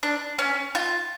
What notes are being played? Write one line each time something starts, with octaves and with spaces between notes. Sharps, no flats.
D4
C#4
F4